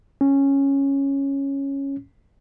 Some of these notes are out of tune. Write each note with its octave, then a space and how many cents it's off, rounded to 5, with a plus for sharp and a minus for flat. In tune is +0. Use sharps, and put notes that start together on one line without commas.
C#4 -5